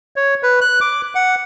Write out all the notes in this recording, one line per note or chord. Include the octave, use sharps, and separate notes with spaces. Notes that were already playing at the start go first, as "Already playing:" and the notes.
C#5
B4
F#6
D6
F#5